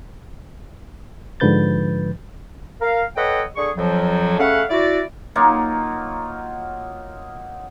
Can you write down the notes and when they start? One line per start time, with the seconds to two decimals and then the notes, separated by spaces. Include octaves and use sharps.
1.40 G#2 D3 F3 B4 G6 A6
2.81 A#4 F5
3.16 A4 B4 C#5 D#5 F#5 G5
3.56 D3 G#4 C#6
3.77 F2 F3 F#3
4.39 C#3 A3 C#4 F5 F#5
4.70 E4 F#4 D5
5.35 F#3 A#3 D#4 F4